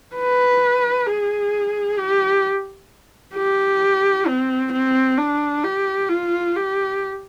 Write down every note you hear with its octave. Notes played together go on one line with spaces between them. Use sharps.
B4
G#4
G4
G4
C4
C4
D4
G4
F4
G4